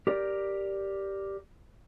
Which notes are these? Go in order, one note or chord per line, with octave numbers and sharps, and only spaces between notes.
G4 A#4 D5